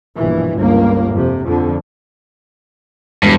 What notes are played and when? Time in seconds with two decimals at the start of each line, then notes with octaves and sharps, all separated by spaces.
0.16 A#1 G2 B2 E3
0.55 G1 C#2 A#3
1.12 F2 C3
1.46 F2 D3
3.23 E1 G2